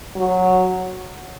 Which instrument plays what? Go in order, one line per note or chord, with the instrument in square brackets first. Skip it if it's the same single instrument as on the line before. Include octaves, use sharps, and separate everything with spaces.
[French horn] F#3